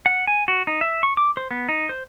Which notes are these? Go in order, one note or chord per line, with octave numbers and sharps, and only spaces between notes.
F#5
G#5
F#4
D#4
E5
C#6
D6
C5
B3
D#4
C5